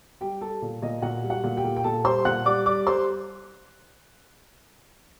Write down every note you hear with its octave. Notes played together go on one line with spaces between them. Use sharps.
G3 G4 G5
G3 A4 A5
A#2
A#2 D#5
A#2 F#4 F#5
G3
F#4 F#5
A#2
G4 G5
A#2
G5
A#2 A4 A5
G3 C5 C6
A#2 F#5 F#6
G3 D5 D6
G3 D5 D6
G3 C5 C6